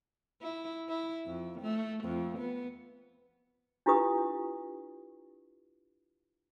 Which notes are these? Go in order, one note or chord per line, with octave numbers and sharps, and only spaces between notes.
E4
E4
F2
A3
F2
B3
D4 E4 F4 G4 B4 D#6